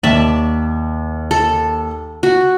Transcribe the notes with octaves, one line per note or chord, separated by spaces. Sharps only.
D#2 D5 E5 A5
A4
F#4